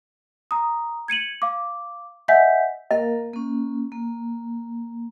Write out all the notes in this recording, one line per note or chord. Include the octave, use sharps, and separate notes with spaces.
A#5 D#6
G#6 C#7 D#7 F#7
F5 D6
D#5 E5 F#5 G#5 G6 B6
A#3 A#4 D#5 F5
A#3 C#4
A#3